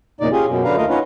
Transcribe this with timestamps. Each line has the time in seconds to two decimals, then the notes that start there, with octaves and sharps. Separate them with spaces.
0.21 E2 A#2 C#3 D#4 D5
0.32 C#4 F4 G4 G#4
0.47 F#2 B2
0.64 F#2 D3 D4 B4 F5 A#5
0.77 D#2 A3 F4 A#4 D#5 F5
0.89 C#4 D#4 F4 B4 C#5 F#5